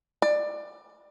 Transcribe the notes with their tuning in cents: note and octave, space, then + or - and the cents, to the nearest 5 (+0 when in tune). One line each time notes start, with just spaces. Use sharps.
D5 +20